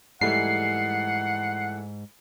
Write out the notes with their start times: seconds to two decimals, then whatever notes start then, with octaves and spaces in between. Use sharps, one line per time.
0.21 G#2 E3 G3 A3 F#5 C7